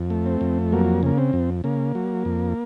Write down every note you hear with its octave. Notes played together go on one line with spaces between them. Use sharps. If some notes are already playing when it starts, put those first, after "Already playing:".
Already playing: F2
A3
C4
F2
F#3 A#3
C#3 A#3
C4
F2
C#3 A#3
F#3
F2